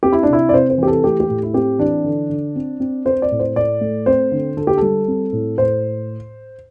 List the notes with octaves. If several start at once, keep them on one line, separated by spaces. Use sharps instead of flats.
C4 G4
E4
D4
C3 E4
D5
C3 C5
C5
E3 G4
A4
A3 G4
G4
A2
E4
C4 G4
E3 D4
D3
D3
C4
C4
C4 C5
D5
A2
C5
A2 D5
A3
C4 C5
D3
D3 A4
G4
G3 A4
C4
A2
A2 C5